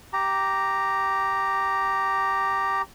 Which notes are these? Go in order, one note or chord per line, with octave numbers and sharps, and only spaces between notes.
G4 A#5